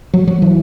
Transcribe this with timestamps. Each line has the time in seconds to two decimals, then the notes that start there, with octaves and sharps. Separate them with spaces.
0.14 F#3
0.27 F#3
0.42 E3